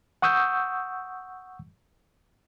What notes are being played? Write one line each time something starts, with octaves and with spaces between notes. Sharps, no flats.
F#5 C#6 D#6 E6 G6